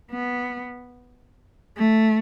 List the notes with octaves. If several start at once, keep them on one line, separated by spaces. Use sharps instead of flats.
B3
A3